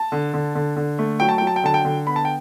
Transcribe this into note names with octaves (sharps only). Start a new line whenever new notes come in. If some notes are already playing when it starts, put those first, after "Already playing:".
Already playing: A5
D3
D3
D3
D3
A3
F#3 G5
A5
F#3 G5
A5
G5
D3 A5
G5
D3
B3 B5
A5
G5